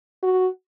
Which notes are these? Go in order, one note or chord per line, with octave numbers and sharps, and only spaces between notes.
F#4